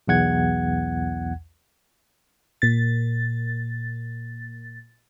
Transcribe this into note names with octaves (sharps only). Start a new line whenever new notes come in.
B1 E2 F#5 G#6
A#2 A6